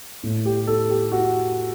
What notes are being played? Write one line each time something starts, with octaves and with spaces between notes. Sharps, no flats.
A2
G4
A4
G4
F#4